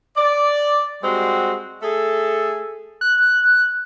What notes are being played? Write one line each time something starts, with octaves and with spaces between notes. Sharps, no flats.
D5
G3 G#3 C4 F#4
A3 G#4 A4
F#6